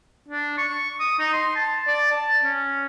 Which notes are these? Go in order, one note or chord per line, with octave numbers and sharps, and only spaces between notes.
D4
C#6
D#6
D#4
C6
A5
D5
A5
C#4